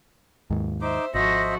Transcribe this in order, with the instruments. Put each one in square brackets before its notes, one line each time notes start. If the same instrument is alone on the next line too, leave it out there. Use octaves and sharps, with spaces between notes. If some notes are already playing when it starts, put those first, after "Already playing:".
[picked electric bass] D#2 G#2
[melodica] D#4 D6 [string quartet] C5 E5
[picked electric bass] G#1 [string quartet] F3 F#4 A4 [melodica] C5 D#5 E5 [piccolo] A#6